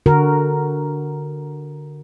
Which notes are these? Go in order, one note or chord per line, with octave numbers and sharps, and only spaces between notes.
D3 F#4 A#4